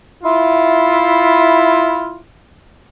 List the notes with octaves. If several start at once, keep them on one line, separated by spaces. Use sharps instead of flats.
E4 F4